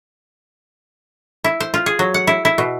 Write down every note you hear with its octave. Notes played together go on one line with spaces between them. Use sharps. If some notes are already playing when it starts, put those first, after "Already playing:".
E4
C5
F4
G#4
F#3
F#5
E4
E4
B2